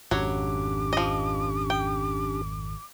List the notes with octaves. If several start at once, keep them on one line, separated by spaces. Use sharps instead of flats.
G#1 F2 F#3 C#4 D4 G4 C#5 D6
F3 D#5
G5